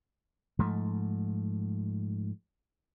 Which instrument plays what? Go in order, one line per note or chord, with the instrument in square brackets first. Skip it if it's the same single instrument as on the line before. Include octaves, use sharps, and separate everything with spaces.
[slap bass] G#2 F3 A3